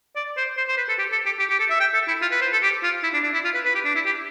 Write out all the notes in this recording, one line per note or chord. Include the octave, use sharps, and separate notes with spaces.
D5
C5
C5
C5
B4
A4
G4
A4
G4
G4
G4
A4
E5
G5
A4
E4
F4
B4
C5
A4
G4
F4
E4
D4
D4
E4
F4
B4
B4
G4
D4
E4
G4